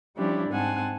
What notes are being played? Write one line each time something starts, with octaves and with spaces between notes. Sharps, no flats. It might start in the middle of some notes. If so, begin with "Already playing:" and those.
F3 G3 C#4 D4 E4 G4
G#2 C4 F#5 G#5 A5